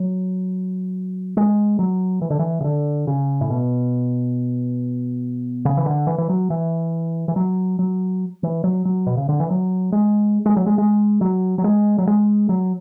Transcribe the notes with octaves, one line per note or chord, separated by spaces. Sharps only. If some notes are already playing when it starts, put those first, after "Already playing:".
Already playing: F#3
G#3
F#3
E3
D3
E3
C#3
D3
C#3
A2
B2
C#3
E3
D3
E3
E3
F#3
E3
E3
F#3
F#3
E3
F#3
F#3
B2
C#3
D3
E3
F#3
G#3
G#3
F#3
G#3
G#3
F#3
F#3
G#3
F#3
G#3
F#3